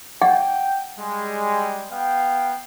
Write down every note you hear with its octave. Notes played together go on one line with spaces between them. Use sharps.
F#5 G5
G3 G#3
B3 F5 G5